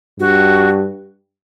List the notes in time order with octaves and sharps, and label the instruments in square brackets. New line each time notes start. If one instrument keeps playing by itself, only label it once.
[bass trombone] G2 [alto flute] F#4